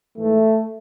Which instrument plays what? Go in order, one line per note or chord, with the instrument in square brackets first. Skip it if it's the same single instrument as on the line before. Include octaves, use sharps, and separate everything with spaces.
[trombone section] G#2 E3 A3